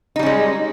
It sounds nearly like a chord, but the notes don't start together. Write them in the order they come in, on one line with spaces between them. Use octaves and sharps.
D#4 G3 C#4 G#3